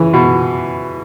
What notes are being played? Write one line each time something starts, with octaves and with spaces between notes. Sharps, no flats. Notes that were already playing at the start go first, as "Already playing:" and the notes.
Already playing: C#3 E3
B2